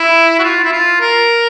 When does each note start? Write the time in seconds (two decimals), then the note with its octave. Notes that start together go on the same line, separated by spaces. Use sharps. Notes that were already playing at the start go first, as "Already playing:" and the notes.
Already playing: E4
0.39 F#4
0.43 F4
0.65 E4
0.72 F4
1.01 A#4